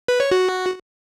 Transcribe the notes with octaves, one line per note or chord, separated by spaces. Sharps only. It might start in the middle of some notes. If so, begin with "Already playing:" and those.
B4
C#5
F#4